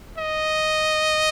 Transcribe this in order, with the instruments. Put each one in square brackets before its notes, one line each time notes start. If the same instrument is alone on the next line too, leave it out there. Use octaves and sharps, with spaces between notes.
[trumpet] D#5